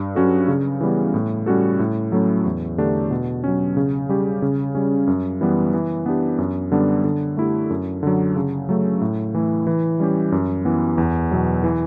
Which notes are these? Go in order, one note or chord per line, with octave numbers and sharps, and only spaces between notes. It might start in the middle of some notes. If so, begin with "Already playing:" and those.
Already playing: G2
F#3 C#4 F#4 A4
C#3
E3 G3 B3
A2
G3 C#4 F#4 A4
A2
F#3 A3 C#4 E4
E2
D3 A3 D4 G4
B2
F#3 C#4
C#3
G3 C#4 G4
C#3
G3 C#4
F#2
E3 G3 B3
E3
B3 D4 G4
F#2
D3 G3 B3 D4
D3
A3 E4 G4
F#2
D3 F#3
C#3
F#3 A3
A2
E3 A3 E4
E3
G3 C#4 G4
F#2
E3 B3
E2
B2 F#3
E3